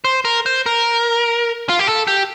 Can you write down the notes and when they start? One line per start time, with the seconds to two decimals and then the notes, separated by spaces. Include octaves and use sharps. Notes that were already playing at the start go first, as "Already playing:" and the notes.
0.05 C5
0.25 A#4
0.46 C5
0.66 A#4
1.69 F4
1.79 G4
1.87 A4
2.07 G4